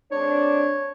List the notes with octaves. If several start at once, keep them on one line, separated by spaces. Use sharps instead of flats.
G#3 C4 D4 C#5